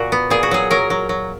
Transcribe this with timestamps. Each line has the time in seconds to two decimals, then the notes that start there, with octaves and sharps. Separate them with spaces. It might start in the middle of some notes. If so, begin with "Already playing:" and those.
Already playing: A#2 F#4
0.12 B3
0.30 A#2 G#4
0.43 F#4
0.51 F#3 G#4
0.71 F#3 A#4
0.90 F#3
1.09 F#3